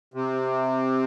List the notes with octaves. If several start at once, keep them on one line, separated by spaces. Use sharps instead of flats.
C3